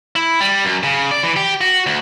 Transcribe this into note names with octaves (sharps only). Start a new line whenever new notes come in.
E4
G3
F#2
C#3
D5
E3
G4
F#4
D2